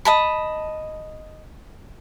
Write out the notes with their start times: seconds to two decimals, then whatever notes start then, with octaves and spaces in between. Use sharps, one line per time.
0.05 D#5 A5 B5